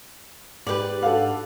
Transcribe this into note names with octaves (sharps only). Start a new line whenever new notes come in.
G#2 G4 B4 D5
D4 F#4 A4 F5 F#5